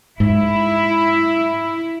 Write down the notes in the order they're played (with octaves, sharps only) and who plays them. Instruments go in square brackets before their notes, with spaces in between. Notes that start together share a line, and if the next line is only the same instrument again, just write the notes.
[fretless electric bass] G#2 [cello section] E4